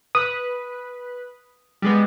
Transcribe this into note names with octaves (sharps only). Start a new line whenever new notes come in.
B4 D#6
G3 G#3 B3